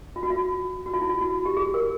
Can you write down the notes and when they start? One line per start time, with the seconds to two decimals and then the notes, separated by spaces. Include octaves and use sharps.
0.16 F4
0.23 F#4
0.30 F4
0.86 F#4
0.94 F4
1.01 E4
1.09 F4
1.21 F#4
1.45 G4
1.57 G#4
1.74 A#4